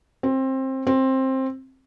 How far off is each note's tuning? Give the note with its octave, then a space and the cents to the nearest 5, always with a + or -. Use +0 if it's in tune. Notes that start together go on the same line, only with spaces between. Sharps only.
C4 +20
C4 +15